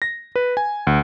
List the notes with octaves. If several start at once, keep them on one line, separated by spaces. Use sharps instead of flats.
A#6
B4
G#5
D2